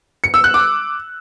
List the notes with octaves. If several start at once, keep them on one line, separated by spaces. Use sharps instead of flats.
C#7
E6
F#6
D6